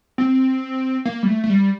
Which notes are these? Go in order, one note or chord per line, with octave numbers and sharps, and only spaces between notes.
C4
A#3
G3
A3
A3
G3